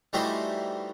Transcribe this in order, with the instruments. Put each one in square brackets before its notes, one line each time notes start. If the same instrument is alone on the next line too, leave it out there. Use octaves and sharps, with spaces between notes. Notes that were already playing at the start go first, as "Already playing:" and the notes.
[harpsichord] E3 G3 A3 D#4 F#4 C5